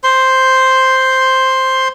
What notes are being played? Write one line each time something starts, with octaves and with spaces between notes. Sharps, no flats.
C5 C6